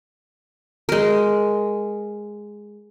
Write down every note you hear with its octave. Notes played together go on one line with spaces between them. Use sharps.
G#3 A#4